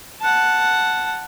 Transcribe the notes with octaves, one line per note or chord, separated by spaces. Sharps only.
F#5 A5